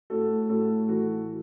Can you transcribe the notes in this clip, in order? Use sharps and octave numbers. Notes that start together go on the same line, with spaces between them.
A2 F#4 A4
A2 F#4 A4
E3 F#4 A4